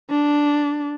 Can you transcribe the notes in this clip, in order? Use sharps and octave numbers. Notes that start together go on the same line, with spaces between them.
D4